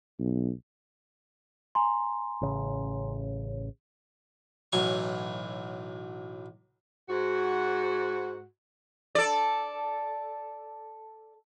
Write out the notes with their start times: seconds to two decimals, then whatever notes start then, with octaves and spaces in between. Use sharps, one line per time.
0.19 B1
1.75 G#5 A#5 C6
2.41 A1 C#3
4.72 B1 A2 E3 F#3 G#5 C#6
7.08 G#2 F#4
9.15 A4 D5